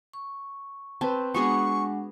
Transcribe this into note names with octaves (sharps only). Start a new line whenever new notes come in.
C#6
C4 B4 A5
G#3 B3 D4 F#4 G#4 F#5 C#6